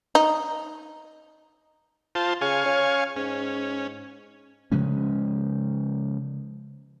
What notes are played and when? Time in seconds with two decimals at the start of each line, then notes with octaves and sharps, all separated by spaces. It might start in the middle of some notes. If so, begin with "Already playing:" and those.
0.15 D#4
2.15 F4 C5 A5
2.41 C#3 F5 G#5 C#6
2.66 C#4
3.17 G#2 C#4
4.72 C#3 F3 G#3 C#4